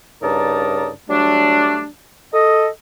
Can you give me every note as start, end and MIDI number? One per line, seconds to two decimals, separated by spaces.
0.22 0.90 43
0.22 0.90 49
0.22 0.90 63
0.22 0.90 70
0.22 0.90 74
0.22 0.90 81
1.09 1.85 54
1.09 1.85 55
1.09 1.85 57
1.09 1.85 62
2.34 2.67 69
2.34 2.67 75